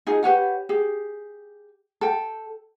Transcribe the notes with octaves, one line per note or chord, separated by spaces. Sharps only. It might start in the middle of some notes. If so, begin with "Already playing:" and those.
D#4 F4 G#4
G4 B4 C#5 F#5
G4 G#4
A4 G5